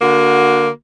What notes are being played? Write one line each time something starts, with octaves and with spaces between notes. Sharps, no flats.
D3 A#3 F#4